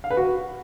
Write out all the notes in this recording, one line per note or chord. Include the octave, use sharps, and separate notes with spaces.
F5
B4
F#4